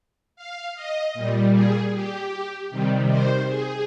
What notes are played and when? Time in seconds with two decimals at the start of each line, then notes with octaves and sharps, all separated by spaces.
0.36 F5
0.75 D#5
1.14 A#2 G3
1.53 G#4
1.92 G4
2.70 C3 D#3 G3
3.09 C5
3.48 G#4